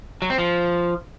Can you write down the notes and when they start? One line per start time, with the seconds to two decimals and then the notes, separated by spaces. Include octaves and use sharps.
0.22 F#3
0.30 C4
0.38 F3